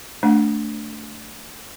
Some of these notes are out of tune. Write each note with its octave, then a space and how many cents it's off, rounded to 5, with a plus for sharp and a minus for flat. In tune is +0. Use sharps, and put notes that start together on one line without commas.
A3 +0 D4 -15 F#5 +20